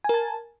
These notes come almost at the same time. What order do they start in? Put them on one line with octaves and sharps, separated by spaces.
G#5 A#4 A5